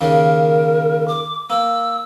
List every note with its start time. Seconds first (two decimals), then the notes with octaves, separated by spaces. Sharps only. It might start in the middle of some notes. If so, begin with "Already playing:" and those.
0.01 D#2 C#3 A#4
1.08 D6
1.50 A#3 E6